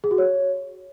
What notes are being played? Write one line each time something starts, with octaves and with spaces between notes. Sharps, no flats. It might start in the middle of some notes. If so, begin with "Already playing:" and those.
G#4
F#4
C#5